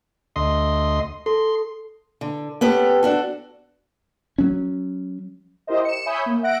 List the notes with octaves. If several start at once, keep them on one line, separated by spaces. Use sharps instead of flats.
D2 D#5 C6
A4 C6
D3
B3 C#4 G4 A4
D4 F#4 A4
F#3 C#4
E4 G4 A#4 C5 D#5
C#7 E7
C#5 E5 G#5 B5 D#6 G6
A#3
E5 F#5 F#6 A#6 D7